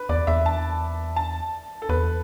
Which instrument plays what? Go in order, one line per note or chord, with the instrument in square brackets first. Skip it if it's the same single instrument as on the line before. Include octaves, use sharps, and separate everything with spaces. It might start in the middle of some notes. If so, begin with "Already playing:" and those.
Already playing: [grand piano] B4
[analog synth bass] E2 [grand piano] D5
[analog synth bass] E2 [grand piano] E5
[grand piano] A5
A5
A4
[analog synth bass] E2 [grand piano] B4